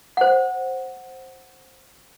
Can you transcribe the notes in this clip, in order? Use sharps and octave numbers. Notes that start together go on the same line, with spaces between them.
C5 F#5